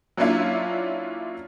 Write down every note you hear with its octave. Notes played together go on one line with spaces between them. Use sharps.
F#3 A#3 C#4 D4 E4 F4